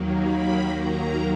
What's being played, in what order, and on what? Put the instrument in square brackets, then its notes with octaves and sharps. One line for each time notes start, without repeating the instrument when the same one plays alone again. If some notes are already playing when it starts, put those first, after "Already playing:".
Already playing: [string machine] D#2 D#3 F#3 A#3
B5
A#5